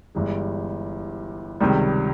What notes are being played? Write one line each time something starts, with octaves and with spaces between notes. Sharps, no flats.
G1 G2 E3 G#3
C#2 C3 D#3 G3